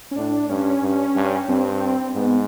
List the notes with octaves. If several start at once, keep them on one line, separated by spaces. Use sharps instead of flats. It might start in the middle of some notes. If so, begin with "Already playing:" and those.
C#4
A2 D4
G2 C#4
G2
G2
G2 C4
G#2 B3